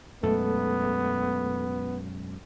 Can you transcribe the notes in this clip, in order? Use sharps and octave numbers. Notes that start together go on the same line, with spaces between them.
F#2 B2 G#3 A3 B3 A4